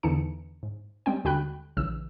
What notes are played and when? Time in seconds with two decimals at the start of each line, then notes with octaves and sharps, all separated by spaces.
0.03 E2 D3 E3 D#4 A5 C#7
0.63 G#2
1.06 G3 G#3 C4 C#4 G5
1.24 D#2 D3 F#4 G5 B5 F#6
1.77 A#1 C#3 E3 E6